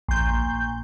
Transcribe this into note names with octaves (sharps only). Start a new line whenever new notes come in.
A#1 G6